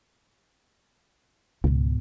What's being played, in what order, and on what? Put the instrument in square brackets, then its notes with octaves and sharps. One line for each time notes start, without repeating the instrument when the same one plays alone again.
[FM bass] C#2 [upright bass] G#2 B2